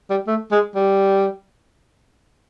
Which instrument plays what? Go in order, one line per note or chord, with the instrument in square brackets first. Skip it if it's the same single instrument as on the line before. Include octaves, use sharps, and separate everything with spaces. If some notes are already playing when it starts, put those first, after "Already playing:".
[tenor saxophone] G3
A3
G#3
G3